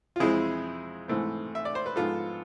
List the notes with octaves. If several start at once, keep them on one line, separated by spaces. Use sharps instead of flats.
F4
F2 E3 G#3 C4 E4 G#4
G#2 E3 A3 C4
E5
D5
C5
B4
G#2 F3 B3 F4 A4